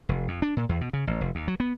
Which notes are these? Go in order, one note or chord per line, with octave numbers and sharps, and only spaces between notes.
F1
F2
D4
A#2
E2
B2
C#3
A1
F1
D#2
F#3
B3